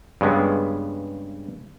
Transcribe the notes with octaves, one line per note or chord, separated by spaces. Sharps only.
G2 C#3 G#3 B3